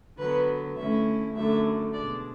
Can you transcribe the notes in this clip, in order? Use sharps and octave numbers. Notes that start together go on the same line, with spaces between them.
D3 F#3 B3 B4
D3 A3 C#4 E4 E5
F#2 D3 A3 D4 E5
B2 G#3 D4 D5